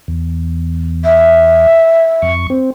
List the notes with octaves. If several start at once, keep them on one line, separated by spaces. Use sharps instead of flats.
E2
E5
F2 C#6
C4